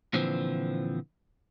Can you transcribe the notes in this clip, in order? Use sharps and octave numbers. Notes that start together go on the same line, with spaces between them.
A#2 D3 E3 F3 C4